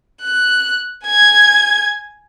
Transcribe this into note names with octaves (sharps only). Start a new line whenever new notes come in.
F#6
G#5 G#6